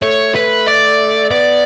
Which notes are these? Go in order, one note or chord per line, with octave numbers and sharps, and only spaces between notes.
A3 C#5
B4
D5
B3 D5